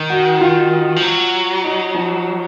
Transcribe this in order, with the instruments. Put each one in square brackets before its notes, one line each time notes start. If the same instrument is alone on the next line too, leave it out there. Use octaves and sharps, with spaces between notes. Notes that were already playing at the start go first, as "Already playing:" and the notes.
Already playing: [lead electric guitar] D#3
[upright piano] F#4
F4
[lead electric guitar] F3
F#3
[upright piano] D#4
F3